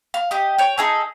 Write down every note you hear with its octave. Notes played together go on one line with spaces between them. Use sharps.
F5
G4 D#5
C#5 G5
D#4 G#4 A4